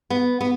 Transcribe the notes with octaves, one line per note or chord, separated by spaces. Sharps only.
B3
B3